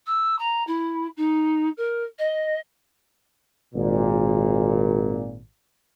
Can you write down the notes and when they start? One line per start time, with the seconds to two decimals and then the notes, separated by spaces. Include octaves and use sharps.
0.06 E6
0.39 A#5
0.67 E4
1.17 D#4
1.77 A#4
2.19 D#5
3.75 G#1 A#2